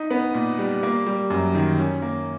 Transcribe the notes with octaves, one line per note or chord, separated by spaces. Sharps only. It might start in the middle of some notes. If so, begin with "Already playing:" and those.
Already playing: D#4
B3
A#2
G3
A#3
G3
F#2
D#3
C#4
A#3